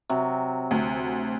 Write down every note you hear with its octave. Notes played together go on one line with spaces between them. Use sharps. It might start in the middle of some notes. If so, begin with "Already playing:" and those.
C3 F#3
D2